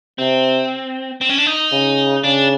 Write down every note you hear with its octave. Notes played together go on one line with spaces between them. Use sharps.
C3 C4
C4
C#4
D4
D#4
C#3
C#3 D4